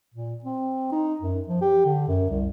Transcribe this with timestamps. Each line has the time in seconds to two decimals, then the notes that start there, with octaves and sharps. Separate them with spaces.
0.14 A#2
0.44 C4
0.92 D#4
1.21 F#2
1.48 F3
1.62 G4
1.85 D3
2.08 F#2
2.30 C2